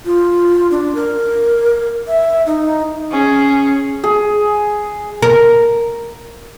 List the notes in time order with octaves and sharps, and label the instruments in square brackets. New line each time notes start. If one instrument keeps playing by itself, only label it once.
[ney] F4
D4
A#4
E5
D#4
[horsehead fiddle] C#4 G#4
[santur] G#4
[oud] A#4